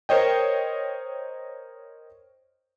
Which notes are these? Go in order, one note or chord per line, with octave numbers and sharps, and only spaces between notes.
A#4 C5 C#5 D#5 G5